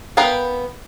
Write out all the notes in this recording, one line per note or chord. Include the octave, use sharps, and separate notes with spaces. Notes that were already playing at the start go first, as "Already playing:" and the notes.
B3 A#4 B4 F5 G5